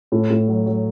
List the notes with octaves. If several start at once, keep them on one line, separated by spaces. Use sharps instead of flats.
A2
A2
F#3
F#3